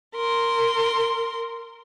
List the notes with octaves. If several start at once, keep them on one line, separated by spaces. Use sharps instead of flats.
A#4 C6